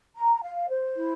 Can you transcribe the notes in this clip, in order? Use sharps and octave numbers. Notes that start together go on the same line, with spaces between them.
A#5
F5
C5
E4